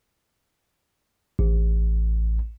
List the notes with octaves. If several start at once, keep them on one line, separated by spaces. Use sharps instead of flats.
A1